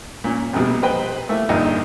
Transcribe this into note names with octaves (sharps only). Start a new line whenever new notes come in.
A#2 C#4
A#1 F2 B2 G3
B4 C5 D#5 G5
A3 A#3 E4
A#1 G2 D3 D#4 D#5